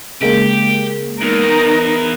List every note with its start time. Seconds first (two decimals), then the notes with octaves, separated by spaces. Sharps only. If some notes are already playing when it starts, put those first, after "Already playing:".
0.21 C#3 G#3 A#3 G4
1.21 E2 D#4 A#4